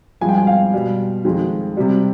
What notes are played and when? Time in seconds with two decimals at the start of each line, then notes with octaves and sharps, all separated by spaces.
0.21 G2 F3 G#3 G#5
0.29 G5
0.38 G#5
0.47 F5
0.74 B2 G3
1.25 F2 D#3 G#3
1.77 C3 G3